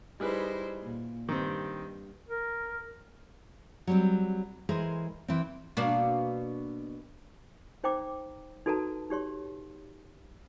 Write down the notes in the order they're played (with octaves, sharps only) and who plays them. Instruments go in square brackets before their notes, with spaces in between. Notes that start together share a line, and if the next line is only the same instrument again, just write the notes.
[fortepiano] G3 G#4 B4 [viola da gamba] D#4 E4 C5
[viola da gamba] A#2
[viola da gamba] G2 [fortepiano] D#3 C4
[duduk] A#4
[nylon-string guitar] F#3 G3 C4
E3 G#3 G#4 A#4 C5
E3 C4
[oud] B2 A#3 D4
[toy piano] D#4 C5 G5 A#5 D6
D#4 F#4 A4 B4 A5 A#5
D#4 G4 C#5 C6